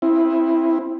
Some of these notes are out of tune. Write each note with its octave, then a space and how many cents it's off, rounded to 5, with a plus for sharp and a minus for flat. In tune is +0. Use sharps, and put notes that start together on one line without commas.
C4 +15 E4 +0